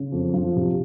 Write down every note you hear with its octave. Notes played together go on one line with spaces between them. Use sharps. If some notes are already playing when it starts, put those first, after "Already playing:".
Already playing: C#3
F2
F3
C3